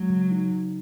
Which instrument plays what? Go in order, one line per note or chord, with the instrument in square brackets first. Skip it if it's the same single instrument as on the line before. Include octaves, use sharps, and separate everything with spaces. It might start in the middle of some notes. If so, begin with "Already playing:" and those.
Already playing: [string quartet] F#3 [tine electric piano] G#3
[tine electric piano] C#3
D#4
C#3